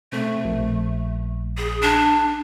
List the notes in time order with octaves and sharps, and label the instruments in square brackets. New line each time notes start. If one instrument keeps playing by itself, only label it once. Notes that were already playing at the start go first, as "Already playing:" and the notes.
[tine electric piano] B2 C4 A4 [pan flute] A3
[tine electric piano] A#1
[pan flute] G#4
D4